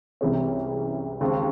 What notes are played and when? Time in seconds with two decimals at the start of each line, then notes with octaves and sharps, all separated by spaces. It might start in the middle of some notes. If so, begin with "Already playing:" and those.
0.21 C2 C3 E3 G#3 C#4
1.21 D#2 C#3 G#3 C4